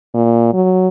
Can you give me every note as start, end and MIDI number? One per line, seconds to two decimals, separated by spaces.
0.14 0.52 46
0.53 0.88 54